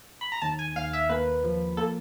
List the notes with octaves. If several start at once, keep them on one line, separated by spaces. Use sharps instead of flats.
B5
A#5
D#2 A5
G#5
D#2 F5
E5
A#3 B4
F3
A#3 A4